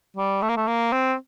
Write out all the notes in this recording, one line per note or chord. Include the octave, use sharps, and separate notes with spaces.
G3
A3
A#3
A3
A#3
C4